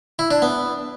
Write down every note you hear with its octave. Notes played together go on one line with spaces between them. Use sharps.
E4
D4
B3